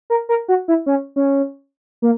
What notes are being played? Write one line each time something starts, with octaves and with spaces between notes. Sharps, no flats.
A#4
A#4
F#4
E4
C#4
C#4
A#3